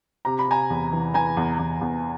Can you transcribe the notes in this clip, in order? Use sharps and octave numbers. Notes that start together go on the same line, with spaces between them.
C3 A#5
B5
C3 G#5 A#5
E2
E3
E3 G#5 A#5
E2
E2
E2